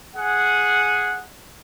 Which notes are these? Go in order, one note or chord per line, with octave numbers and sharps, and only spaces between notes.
G#4 F#5